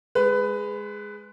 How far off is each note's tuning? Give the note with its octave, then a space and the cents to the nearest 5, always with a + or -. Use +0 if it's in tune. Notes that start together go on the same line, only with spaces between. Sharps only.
G#3 +0 B4 +15